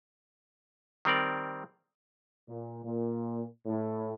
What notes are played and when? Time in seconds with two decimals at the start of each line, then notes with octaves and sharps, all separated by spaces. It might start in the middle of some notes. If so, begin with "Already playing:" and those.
1.05 D#3 G3 C4 A#4 D5
2.47 A#2
2.83 A#2
3.66 A2